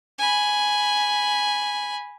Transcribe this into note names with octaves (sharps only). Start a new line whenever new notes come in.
G#5 B5